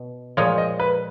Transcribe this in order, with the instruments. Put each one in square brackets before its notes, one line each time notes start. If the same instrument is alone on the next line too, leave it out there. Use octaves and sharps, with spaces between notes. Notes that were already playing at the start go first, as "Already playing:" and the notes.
Already playing: [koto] B2
[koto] A#2 F3 G#3 [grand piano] C#5
[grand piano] D#5
B4